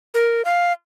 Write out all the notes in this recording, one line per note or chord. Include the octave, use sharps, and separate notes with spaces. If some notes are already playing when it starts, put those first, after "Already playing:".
A#4
F5